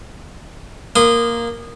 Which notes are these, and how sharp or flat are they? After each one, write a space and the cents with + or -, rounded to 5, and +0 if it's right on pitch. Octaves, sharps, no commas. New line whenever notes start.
A#3 +0 C6 -30 D#6 -20